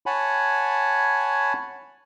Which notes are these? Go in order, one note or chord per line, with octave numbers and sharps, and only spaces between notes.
C#5 F#5 G#5 A5 B5